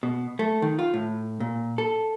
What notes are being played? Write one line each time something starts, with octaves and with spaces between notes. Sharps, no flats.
B2
A3
D#3
F4
A2
A#2
A4